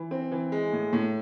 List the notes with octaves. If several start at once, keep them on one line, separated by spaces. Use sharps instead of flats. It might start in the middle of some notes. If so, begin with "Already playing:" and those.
Already playing: E3
C4
E3
G#3
A2
A2